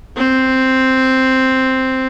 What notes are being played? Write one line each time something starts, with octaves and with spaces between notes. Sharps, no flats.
C4